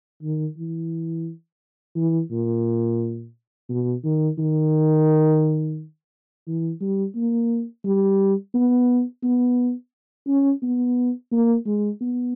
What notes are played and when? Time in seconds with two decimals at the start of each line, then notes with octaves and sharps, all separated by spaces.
0.23 D#3
0.58 E3
1.96 E3
2.31 A#2
3.69 B2
4.04 D#3
4.38 D#3
6.47 E3
6.81 G3
7.16 A#3
7.85 G3
8.54 B3
9.23 B3
10.27 C#4
10.62 B3
11.32 A#3
11.66 G#3
12.01 B3